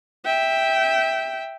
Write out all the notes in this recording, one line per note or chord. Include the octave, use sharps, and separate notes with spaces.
E5 G5